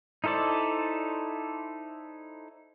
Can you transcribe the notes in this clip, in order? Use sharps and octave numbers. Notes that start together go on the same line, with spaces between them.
D#4 E4 A4 C5 D5